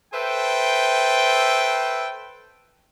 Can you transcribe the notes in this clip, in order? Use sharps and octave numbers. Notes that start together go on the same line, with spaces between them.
A4 B4 C5 E5 G5